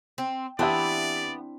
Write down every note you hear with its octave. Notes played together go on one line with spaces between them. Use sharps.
C4
E3 B3 C4 D4 E4 G4 D5 E5